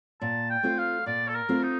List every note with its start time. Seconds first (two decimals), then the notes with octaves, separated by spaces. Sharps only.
0.21 A#2 A5
0.50 G5
0.63 A3 C4 F4
0.78 F5
1.06 A#2 D5
1.28 A4
1.35 A#4
1.49 A3 C4 F4
1.63 D#4